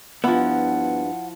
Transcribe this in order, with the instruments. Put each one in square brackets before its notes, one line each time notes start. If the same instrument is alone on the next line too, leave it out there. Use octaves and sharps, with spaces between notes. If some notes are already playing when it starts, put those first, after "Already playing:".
[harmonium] G2 [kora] F3 E4 [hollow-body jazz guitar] B3 [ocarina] F#5